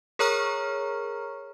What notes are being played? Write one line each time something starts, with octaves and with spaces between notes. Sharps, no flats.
G#4 A#4 C#5 A#5 C#6 F6